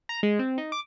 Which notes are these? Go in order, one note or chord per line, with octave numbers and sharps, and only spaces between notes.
A#5
G#3
C4
D#4
D6